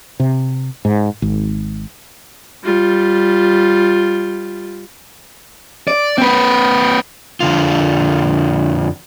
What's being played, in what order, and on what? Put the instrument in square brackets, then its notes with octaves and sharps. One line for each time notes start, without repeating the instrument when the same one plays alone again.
[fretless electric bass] C3
G#2
G#1
[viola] G3 F4
[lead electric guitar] D5
C4 B4
[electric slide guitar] F2 D3 F4